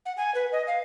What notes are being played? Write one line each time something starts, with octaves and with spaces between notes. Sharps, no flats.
F#5
G#5
B4
D#5
F5